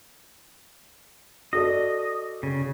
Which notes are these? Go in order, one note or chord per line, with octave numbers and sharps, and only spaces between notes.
F#4 A4 D5 D#5
C#3